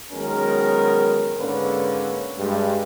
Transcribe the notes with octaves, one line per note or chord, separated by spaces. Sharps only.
D#3 F#3 G#3 B3 C#4 A#4
G#2 D3 A#3 C#4 B4
G2 G#3